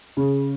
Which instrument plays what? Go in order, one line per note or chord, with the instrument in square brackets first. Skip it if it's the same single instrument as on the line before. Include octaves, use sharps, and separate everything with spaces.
[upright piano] C#3